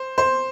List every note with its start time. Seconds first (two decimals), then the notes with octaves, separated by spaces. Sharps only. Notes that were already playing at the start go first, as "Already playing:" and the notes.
Already playing: C5
0.18 C5